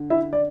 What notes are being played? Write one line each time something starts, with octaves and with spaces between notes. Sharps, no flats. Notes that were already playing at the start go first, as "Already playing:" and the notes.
Already playing: D3
E4 E5
D5